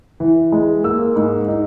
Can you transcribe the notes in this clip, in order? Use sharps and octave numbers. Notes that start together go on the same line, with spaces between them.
E3
G#3
A#3 E6
G#2
D#4